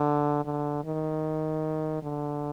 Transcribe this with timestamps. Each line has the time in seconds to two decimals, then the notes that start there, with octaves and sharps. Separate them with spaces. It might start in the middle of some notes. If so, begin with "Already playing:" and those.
Already playing: D3
0.45 D3
0.85 D#3
2.03 D3